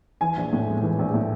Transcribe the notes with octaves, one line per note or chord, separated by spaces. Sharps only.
E3 G#5
A#1
A2
G#3
E3
A#1
A2